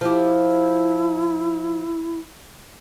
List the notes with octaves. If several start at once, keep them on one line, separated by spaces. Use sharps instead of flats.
F3 E4 G4